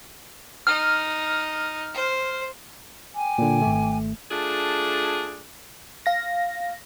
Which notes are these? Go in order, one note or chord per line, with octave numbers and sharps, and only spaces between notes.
D#4 F6
C5
G5 G#5 D6
A#2 D3
G#1 A3
A3 D4 F4 G#4
F5 A#6